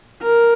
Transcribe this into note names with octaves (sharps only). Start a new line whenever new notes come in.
A#4